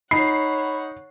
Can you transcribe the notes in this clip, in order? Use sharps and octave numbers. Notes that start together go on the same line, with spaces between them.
D#4 C#5 F#5 B5 C7